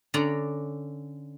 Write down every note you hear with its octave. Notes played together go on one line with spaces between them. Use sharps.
D3 C#4 D5 A#5